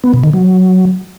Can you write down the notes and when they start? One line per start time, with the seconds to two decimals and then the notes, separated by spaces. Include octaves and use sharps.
0.04 B3
0.14 B2
0.24 D#3
0.33 F#3